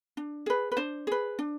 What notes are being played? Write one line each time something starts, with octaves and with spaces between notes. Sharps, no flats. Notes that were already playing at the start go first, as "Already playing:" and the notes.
D4
G#4 B4
B4
D4 C5
G#4 B4
D4